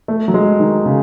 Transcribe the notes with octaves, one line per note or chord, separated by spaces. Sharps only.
A3
F#3
G#3
D#3
C#3